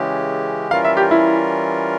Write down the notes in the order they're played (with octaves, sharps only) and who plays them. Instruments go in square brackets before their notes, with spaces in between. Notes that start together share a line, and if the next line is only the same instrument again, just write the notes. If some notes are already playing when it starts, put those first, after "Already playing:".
Already playing: [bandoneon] C#3 E3 G#3 C#4 G4
[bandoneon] E3 G3 C#4 F4 A#4 [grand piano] F5
[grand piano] E5
G4
E4